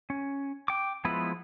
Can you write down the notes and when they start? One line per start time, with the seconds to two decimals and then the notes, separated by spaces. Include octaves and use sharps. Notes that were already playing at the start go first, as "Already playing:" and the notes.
0.10 C#4
0.68 G5 D6
1.05 F3 G#3 B3 E4 B4